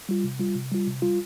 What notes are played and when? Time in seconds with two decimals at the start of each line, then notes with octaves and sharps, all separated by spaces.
0.09 G3 F4
0.24 C3
0.39 G3 F4
0.55 C3
0.72 G3 F4
0.87 C3
1.02 G3 F4